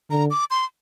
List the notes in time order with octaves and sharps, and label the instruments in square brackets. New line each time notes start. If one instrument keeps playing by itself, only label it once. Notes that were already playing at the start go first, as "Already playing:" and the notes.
[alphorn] D3 [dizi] A#5
[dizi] D6
C6